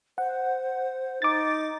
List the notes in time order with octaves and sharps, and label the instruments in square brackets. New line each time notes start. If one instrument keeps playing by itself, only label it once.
[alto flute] C5 [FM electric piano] F#5
[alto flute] D#4 [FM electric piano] D6 A6